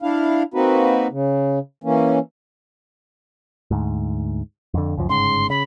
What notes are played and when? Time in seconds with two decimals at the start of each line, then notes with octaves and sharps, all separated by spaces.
0.02 D4 E4 F5
0.54 A#3 C4 D#4 F#4 B4
1.11 C#3
1.84 E3 A#3 C#4
3.71 D2 G#2
4.74 F2 D3
4.97 C#2 F#2 F3
5.09 G1 G#2 C#3 C6
5.50 C#3 B5